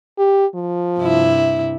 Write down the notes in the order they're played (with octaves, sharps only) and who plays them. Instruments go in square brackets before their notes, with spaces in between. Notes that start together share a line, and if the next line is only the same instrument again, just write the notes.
[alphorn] G4
F3
[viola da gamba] G2 C3 E4